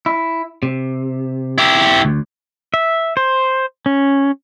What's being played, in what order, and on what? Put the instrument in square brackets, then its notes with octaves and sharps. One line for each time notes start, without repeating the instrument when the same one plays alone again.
[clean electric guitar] E4
C3
[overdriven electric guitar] E4 G4
[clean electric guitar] D2
[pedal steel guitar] E5
C5
C#4